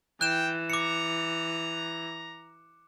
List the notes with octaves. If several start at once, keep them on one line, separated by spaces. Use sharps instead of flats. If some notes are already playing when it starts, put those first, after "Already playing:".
E3 G5 F#6 E7
A#5 D6 C#7